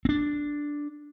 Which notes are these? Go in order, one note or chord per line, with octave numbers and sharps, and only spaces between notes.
C4 D4